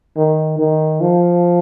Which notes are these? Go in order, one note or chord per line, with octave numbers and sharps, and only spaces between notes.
D#3
D#3
F3